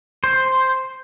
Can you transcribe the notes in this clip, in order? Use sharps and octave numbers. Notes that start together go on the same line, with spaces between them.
C5